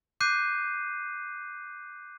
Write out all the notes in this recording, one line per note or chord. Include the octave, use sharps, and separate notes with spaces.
D6 F#6 G6 C7 D#7